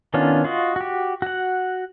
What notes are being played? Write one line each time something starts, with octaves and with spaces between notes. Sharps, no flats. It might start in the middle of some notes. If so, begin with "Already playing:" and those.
D#3 B3 C#4 D4 F4
F4 F#4 D#5
F#4 G4
F#4 F#5